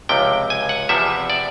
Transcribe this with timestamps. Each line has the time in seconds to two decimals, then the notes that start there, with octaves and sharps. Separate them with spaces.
0.09 C#2 C3 F3 G5
0.50 G#5
0.69 F#5
0.89 E2 C3 F3 E5
1.30 D5